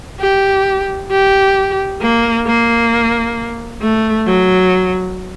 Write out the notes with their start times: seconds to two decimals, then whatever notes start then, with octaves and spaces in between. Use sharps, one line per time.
0.20 G4
1.11 G4
2.01 A#3
2.47 A#3
3.82 A3
4.27 F#3